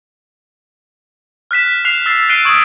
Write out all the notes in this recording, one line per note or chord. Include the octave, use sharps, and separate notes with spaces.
F6 F#6 B6 E7
B6
F6 F#6 C7 F7
E6 A6 C7
F#6 C7 D7 D#7 F7 G7
C#6 D#6 G#6 D7 F#7